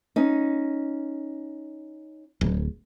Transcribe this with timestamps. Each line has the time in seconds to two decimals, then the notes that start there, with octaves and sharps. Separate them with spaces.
0.16 C#4 D#4
2.41 D1